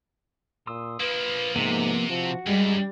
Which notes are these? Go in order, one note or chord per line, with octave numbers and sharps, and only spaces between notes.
A#2 C6 D#6 E6
F3 A#3 B4
G#2 C3 F3 A#3 B3
F3 F#4
F#2 G3 G#3